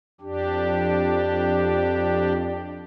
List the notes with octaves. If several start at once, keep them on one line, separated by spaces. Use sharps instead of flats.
F2 D4 G4